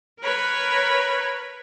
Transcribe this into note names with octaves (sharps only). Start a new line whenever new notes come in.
A#4 B4 C#5 B5